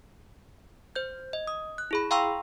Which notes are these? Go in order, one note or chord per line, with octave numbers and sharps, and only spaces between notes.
C5 G6
D#5
D#6
F#6
E4 G#4 B5
F5 G5 A#5 C6 C#6 E6